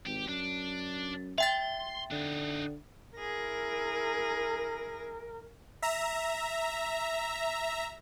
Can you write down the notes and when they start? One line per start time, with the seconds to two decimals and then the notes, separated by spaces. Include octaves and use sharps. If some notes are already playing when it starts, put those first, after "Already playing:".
0.06 G#1 G4
0.28 F#2 D4
1.38 E5 G5 C6 A6
2.11 D3 D4 D#4
3.17 E4 G#4 A#4 A#6
5.82 E5 A#5